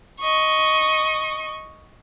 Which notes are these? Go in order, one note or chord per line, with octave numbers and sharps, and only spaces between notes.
D#5 C#6